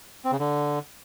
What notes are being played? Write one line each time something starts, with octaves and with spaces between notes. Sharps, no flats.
C4
C#3
D3